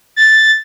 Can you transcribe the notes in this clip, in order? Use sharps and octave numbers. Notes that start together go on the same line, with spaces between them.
A6